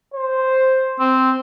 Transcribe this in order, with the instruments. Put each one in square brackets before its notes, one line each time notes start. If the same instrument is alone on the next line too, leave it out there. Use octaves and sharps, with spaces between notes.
[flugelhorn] C5
[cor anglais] C4